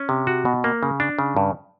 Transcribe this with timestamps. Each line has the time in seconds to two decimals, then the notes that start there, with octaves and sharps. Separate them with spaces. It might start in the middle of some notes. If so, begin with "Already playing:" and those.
Already playing: C#4
0.09 C3
0.27 F#4
0.45 B2
0.64 A#3
0.83 C#3
1.00 D4
1.19 C#3
1.37 G2